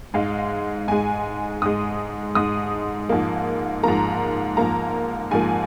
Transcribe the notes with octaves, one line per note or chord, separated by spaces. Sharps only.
G#2 G#3 F5
G#2 G#3 G#5
G#2 G#3 D#6
G#2 G#3 D#6
G#2 F3 A#3
G#2 F3 A#3 A#5
G#2 F3 A#3 A#5
G#2 F3 A#3 G#5